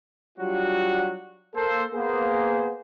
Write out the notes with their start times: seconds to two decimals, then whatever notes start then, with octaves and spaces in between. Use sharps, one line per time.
0.39 F#3 G3 D4 F4 F#4
1.55 A#3 A4 A#4 C5
1.93 A#3 B3 G#4 C5